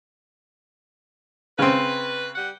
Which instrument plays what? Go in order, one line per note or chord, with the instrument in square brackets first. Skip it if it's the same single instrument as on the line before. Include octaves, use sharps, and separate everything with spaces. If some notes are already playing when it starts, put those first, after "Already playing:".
[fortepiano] C#3 C4 [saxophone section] B4
[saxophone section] G3 F#5